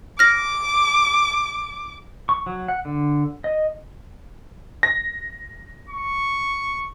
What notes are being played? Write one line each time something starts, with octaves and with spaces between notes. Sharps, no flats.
D6 F6 A#6
C#6
F#3
F#5
D3
D#5
A#6
C#6